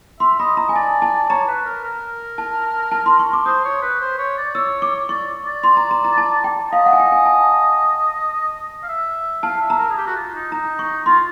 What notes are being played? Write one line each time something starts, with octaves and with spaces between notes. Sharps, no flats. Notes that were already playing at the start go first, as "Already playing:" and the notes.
E5 C6
D#5 B5
D#5 A#5
G#5
D5 A5
A5
C#5 A#5
B4
A#4
A#4
A5
A5
C6
C#6
D6
C5 D#6
C#5
B4
C5
C#5
D5
C#5 E6
D6
D5 C#6
D5
C6
A#5
A#5
A#5
A5
G5
D#5 F5
F#5
G#5
G5
G#5
A5
F5
E5
F5 A5
E5
A#5
A#4
G#4
G4
F#4
F4
D#4
D#4 A#5
C#6
F4 C6